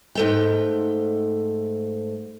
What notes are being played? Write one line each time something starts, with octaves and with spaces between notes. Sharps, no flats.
G#2 A3 G5